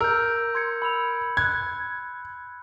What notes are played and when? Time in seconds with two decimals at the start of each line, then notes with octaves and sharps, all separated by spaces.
0.01 A#4 E6 G6
0.55 C6 G#6 C#7
0.82 B5 E6 F7
1.37 F#6 G#6